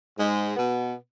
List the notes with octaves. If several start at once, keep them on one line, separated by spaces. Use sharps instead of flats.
G#2 G#3
B2 B3